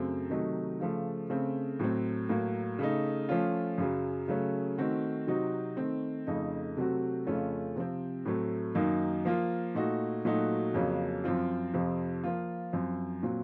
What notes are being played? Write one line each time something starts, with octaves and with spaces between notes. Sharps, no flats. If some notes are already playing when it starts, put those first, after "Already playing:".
Already playing: F#2 C#3 F#3 A3 C4
C3 D#3 F#3 A3 D#4
C#3 F3 A3
C#3 A3 C4
A2 F#3 A3 C4
A2 F#3 A#3
C#3 A3 D#4
F3 A3 C#4 F4
F#2 C#3 F#3
C#3 F#3 A3 C#4
D#3 A3 C4 F#4
C3 F#3 C4 D#4 F#4
D#3 A3 C4
F2 C#3 A3 D#4
C3 F#3 A3 C4 F#4
F2 C#3 A3 C#4 F4
C3 F3 C4
A2 F#3 A3 C4
F#2 D#3 F#3 A#3 D#4
F3 A#3 F4
A#2 A3 D#4 F#4
A#2 F#3 A3 D#4 F#4
F2 C#3 F#3 A#3 C#4
F#2 F3 C4 F4
F2 C3 F3 C4
F3 A#3 F4
F#2 F3 C4
A#2 F#3 C4